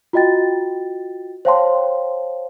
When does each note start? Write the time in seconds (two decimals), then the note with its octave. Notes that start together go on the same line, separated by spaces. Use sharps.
0.13 F4 F#4 D#5 G5 A6
1.45 C5 C#5 F5 G5 A5 C6